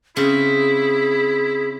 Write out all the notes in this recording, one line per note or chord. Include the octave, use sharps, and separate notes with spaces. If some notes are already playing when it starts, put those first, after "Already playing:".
C#3 C4 E4 G#4